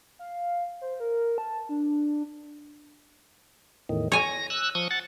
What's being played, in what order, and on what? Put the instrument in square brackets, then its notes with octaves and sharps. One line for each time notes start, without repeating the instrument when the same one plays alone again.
[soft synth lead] F5
C5
A#4
A5
D4
[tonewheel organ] E2 A2 D#3
[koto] C#5 G#5 [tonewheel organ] A#6
[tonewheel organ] E6 F#6
F3 C#6 D#6
F#5 A6